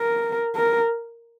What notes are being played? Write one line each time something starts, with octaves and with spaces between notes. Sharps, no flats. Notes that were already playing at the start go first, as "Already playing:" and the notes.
Already playing: A#4
A#4